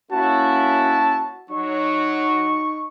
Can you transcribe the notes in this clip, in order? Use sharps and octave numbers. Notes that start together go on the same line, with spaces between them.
A#3 C#4 E4 F#4 A5
F#3 D#4 C#6